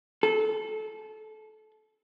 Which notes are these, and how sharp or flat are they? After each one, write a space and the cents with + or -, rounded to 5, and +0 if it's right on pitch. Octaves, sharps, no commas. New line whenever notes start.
A4 -25